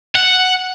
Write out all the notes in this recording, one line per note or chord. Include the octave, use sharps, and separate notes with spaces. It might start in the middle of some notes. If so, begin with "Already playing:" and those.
F#5